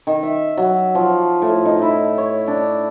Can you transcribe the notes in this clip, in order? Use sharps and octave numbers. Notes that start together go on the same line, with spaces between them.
D#3
E5
F#3
F3
A2
D#4
E4
C#5
D4